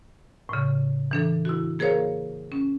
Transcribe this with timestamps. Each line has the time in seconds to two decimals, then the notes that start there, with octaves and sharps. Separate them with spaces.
0.49 A2 C#3
1.11 E3 D4 A4
1.45 E4 F#4
1.79 A#3 G#4 A#4 C5 C#5 F5
2.52 C#4